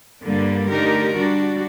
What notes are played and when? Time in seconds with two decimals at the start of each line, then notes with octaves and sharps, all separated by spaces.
0.23 G2 D3 G3 A#3 D4
0.70 D3 A3 D#4 G4 A#4
1.16 G3 D4 F#4